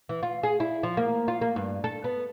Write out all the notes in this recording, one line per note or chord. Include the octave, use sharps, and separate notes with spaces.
E3
F4
G#4
E4
F3
A#3
F4
A#3
G2
A4
B3